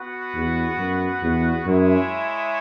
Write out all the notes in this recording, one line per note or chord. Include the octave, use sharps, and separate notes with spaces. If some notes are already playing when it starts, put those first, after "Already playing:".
Already playing: B3 F#4 B4 F#5
E2
F#2
E2
F#2 G#3 E4 G#4 C#5 E5